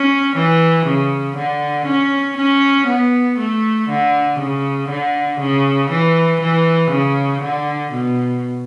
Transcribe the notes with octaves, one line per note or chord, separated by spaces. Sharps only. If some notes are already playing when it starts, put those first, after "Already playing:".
Already playing: C#4
E3
C#3
D3
C#4
C#4
B3
A3
D3
C#3
D3
C#3
E3
E3
C#3
D3
B2